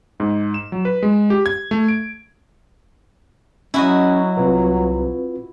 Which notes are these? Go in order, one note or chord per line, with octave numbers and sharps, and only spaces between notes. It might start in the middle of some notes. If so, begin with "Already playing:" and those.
G#2
E7
F#3
B4
G#3
G4
G#6
A3
D7
F#3 C#4 E4 F#4 D#5
C2 C4 F4 B4